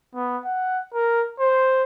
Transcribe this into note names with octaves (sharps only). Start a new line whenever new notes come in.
B3
F#5
A#4
C5